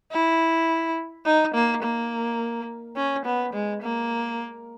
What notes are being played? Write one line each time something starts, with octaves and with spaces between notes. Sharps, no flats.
E4
D#4
A#3
A#3
C#4
B3
G#3
A#3